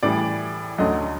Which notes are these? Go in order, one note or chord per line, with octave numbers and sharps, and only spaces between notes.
A2 E3 G3 D5
D2 D3 F#3 D#5